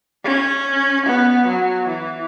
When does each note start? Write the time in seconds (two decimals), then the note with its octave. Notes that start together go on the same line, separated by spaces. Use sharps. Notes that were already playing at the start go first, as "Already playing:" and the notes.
0.24 C#4
1.06 B3
1.47 F#3
1.88 E3